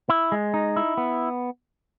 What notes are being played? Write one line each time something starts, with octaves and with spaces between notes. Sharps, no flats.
E4
G#3
D#4
E4
B3